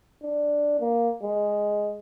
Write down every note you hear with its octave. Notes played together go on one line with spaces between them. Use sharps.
D4
A#3
G#3